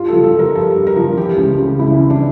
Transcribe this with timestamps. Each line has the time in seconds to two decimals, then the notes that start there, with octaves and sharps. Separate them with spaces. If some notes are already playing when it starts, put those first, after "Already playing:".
Already playing: G2 F4
0.08 F3 A4
0.24 A4
0.34 F3
0.39 A#4
0.55 G2 A4
0.76 G2
0.87 A#4
0.96 F3
1.17 E3 G4
1.37 C#2
1.59 C#3
1.79 C#2 E4
2.00 E3
2.10 D4